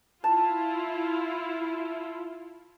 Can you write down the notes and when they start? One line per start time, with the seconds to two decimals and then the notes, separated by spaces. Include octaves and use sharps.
0.24 E4 F4 A5